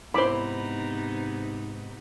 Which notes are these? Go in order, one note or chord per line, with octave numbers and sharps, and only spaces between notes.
G#2 C3 B3 D#4 E4 C5 B5 D6